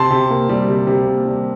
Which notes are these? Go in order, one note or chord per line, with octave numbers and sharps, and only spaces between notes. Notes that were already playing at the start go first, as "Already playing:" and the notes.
Already playing: C3 A5 C6
C3
A#3
G3
C3
C3
A#3
G3